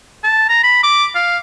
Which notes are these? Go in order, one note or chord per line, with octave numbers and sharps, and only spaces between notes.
A5
A#5
B5
D6
F5